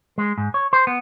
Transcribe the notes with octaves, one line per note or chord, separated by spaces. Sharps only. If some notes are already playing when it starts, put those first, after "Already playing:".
G#3
G#2
C#5
C5
B3